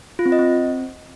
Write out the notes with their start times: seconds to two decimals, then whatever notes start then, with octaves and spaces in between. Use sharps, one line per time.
0.19 F4
0.26 C4
0.32 D#5
0.39 C4